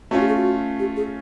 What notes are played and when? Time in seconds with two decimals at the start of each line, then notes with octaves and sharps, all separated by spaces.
0.11 A3 C#4 F4 F#4
0.20 G4
0.28 G#4
0.37 F#4
0.79 G4
0.97 G#4